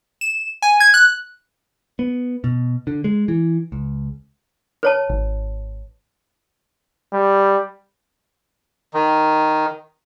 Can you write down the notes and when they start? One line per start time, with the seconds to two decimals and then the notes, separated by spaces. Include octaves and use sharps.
0.21 E7
0.62 G#5
0.80 G#6
0.94 F#6
1.99 B3
2.44 B2
2.87 D3
3.04 G#3
3.28 E3
3.72 C#2
4.83 B4 C#5 A5
5.09 G#1
7.13 G3
8.94 D#3